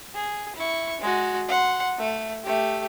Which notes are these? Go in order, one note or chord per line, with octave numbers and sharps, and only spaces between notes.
G#4
E4 C#6
G#3 F#4
F#5 C6
A3
A3 G4